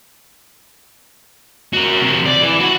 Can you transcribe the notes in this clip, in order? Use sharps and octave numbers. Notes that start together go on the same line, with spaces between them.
F#4 A#4
C3 F3
D5
E3
F#4 F#5